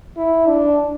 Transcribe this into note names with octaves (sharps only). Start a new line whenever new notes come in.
E4
D4